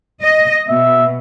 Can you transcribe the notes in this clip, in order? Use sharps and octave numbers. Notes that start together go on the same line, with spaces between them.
D#5
B2 E5